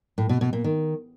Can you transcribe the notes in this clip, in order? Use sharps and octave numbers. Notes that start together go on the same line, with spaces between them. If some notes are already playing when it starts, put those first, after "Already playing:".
A2
B2
B2
A#2
D#3